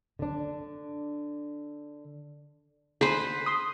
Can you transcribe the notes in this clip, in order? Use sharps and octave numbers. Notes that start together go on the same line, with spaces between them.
D3 D4
G#4 B4 C5
C6 D#6